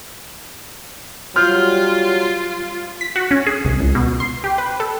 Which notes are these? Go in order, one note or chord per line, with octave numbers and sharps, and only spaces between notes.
F#3 G3 F4 C6 F6 G6
B6
F#4
C#4
G#4
C2
C#2
B2
C6
G4
B4
A4